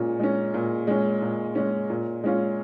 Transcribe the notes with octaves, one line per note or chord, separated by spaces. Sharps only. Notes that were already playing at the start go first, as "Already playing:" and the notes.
Already playing: A#2 G#3 C#4
G#3 C#4
A#2
G#3 C#4
A#2
G#3 C#4
A#2
G#3 C#4 F4